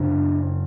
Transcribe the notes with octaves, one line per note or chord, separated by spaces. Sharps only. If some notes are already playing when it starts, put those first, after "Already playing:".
Already playing: F#2 C#3 D4